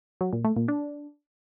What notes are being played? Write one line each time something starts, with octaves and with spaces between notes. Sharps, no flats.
F#3
A#2
A3
A#2
D4